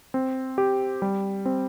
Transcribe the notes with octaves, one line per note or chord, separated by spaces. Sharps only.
C4
G4
G3
C4